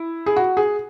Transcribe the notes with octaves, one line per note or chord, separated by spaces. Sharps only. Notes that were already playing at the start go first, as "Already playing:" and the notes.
Already playing: E4
G#4
F#4
G#4